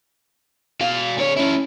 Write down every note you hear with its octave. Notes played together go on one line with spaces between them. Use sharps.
B2 F5
D3 C#5
C#4 E4